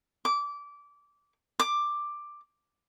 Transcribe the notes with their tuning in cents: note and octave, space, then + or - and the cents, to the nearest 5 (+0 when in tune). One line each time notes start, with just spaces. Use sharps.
D6 -20
D6 +10